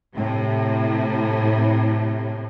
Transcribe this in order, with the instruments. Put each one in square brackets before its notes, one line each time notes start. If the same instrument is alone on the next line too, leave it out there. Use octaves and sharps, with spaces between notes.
[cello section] A2 C3